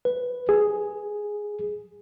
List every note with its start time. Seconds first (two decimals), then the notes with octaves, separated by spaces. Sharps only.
0.05 B4
0.49 G#4